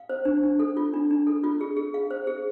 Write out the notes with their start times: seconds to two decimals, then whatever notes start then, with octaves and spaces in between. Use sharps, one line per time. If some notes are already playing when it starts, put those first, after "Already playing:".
Already playing: F5
0.09 C5
0.25 D4
0.43 D4
0.59 A4
0.77 F4
0.94 D4
1.11 D4
1.27 A4
1.44 F4
1.61 G#4
1.77 G#4
1.94 F5
2.11 C5
2.27 G#4